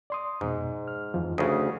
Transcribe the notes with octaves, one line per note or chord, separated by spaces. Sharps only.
D5 C6 D#6
F2 G#2 B2
F6
F2 E3 F3
D2 C#3 D#6